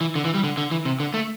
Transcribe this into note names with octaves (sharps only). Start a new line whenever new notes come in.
E3
D3
E3
G3
D3
D3
E3
C3
D3
A3